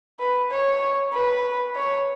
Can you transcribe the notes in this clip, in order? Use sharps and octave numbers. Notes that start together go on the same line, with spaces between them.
B4
C#5
B4
C#5